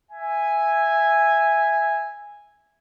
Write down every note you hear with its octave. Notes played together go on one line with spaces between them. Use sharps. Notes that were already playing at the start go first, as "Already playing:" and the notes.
E5 G#5